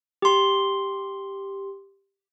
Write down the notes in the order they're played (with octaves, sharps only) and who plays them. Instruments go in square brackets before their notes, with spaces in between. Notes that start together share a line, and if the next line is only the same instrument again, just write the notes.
[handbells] G4 C6